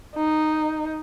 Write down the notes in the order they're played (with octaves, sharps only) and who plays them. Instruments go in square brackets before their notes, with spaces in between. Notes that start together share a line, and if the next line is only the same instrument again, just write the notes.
[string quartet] D#4